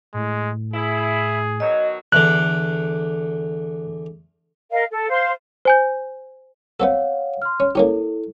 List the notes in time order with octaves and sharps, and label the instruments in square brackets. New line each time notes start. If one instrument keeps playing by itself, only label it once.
[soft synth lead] A2 [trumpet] G#3
[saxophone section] E4 [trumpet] G#4
[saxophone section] B2 D#3 F#3 [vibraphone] D#5
[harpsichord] E2 D3 [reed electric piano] F#6
[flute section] A#4 D#5 F5
A4
C5 F5 C6
[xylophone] C5 G#5 G6
[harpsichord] B3 C4 A4 [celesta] C#5 F5 F#5
[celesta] C6 F6
[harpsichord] C#4
[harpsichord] A#3 C#4 G4 [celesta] E4 A4